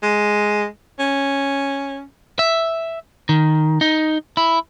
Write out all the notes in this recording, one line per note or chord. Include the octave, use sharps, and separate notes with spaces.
G#3
C#4
E5
D#3
D#4
E4